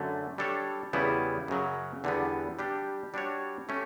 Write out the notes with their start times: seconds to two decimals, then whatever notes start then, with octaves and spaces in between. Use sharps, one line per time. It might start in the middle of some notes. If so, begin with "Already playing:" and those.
Already playing: F#2 D3 A3
0.38 G3 D4 A4 C#5
0.93 E2 C#3 G3 B3 E4
1.48 F#2 C#3 F#3
2.04 E2 D3 G3 B3
2.59 G3 D4 G4
3.14 G3 D4 F#4 C#5
3.69 A3 C#4 G4